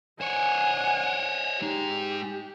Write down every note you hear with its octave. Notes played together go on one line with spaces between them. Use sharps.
C5 C#5 F#5 G#5
G#3 D#4 G4